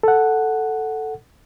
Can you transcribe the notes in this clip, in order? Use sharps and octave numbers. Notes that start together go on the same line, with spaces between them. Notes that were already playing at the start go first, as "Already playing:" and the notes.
A4 F#5